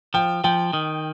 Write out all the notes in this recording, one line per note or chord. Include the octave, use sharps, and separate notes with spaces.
F3 G5
F3 G5
D#3